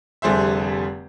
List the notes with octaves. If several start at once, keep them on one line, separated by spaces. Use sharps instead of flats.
F1 D3 G3 G#4 C5 E5